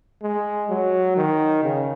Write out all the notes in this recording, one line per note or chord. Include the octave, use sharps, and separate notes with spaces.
G#3
F#3
D#3
C#3